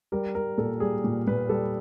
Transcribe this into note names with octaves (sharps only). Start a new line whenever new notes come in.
G3 A#4
G3 A#4
A#2 A4
G3 G#4
A#2
A#2 B4
G3 A4